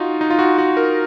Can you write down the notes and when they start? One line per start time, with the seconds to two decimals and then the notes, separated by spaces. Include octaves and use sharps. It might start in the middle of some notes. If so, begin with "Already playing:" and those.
Already playing: D#4 F4 F#4
0.21 D#4
0.30 F4
0.39 F#4
0.58 F#4
0.77 A#4